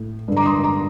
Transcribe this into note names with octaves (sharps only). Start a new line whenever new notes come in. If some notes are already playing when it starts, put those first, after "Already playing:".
Already playing: A2
G2 D3
A#5 D6
C6 D#6
A#5 D6